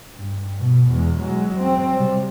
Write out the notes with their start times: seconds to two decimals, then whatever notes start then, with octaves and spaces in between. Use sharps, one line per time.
0.15 G2
0.59 B2
0.91 E2 G#3
1.20 F#3 G#3
1.59 C4
1.94 C3 G3